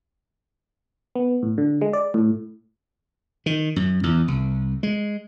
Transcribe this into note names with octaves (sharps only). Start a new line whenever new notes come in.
B3
A2
D3
G#3
D5
A2
D#3
F#2
E2
C2
G#3